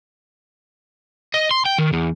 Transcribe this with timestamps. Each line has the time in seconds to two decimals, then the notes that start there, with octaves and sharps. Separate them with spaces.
1.34 D#5
1.51 C6
1.65 G5
1.78 D#3
1.93 E2